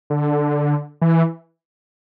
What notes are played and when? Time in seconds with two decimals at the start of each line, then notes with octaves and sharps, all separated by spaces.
0.10 D3
1.02 E3